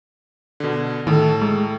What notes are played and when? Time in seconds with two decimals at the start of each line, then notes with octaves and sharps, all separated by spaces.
0.60 B2 D3
1.07 A2 D#3 A4
1.42 G#3